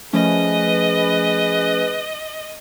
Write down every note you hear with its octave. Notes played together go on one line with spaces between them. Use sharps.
F3 A3 C#4 G#4 B4 D#5